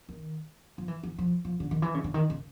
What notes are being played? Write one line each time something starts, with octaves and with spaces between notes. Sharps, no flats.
D#3
F3
E3
E3
F3
F3
D3
D#3
E3
C#3
D3
D#3
C#3